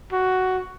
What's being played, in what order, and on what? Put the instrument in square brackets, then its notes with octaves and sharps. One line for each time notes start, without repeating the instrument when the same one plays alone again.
[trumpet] F#4